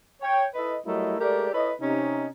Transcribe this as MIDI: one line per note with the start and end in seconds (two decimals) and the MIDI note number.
0.21 0.46 73
0.21 0.46 79
0.55 0.76 64
0.55 0.76 69
0.55 0.76 71
0.55 0.76 75
0.85 1.16 54
0.85 1.16 55
0.85 1.16 57
0.85 1.16 64
0.85 1.16 70
0.85 1.16 75
1.20 1.50 56
1.20 1.50 57
1.20 1.50 67
1.20 1.50 70
1.20 1.50 74
1.52 1.71 64
1.52 1.71 69
1.52 1.71 71
1.52 1.71 73
1.52 1.71 75
1.81 2.27 48
1.81 2.27 61
1.81 2.27 63